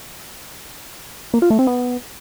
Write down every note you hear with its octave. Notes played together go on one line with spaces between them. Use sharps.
A#3
F4
A3
C4
B3